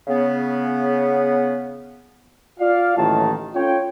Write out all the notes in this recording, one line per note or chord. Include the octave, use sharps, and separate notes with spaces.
C#3 B3
F4 D5 F5
A1 D#2 A2 D#3 F#3 A5
C#4 F4 A4 C#5 G5